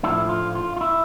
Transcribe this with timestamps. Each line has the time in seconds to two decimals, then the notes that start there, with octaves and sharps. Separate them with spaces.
0.03 A2 F3 A3 D4 E4
0.29 F4
0.55 F4
0.76 F4
0.81 E4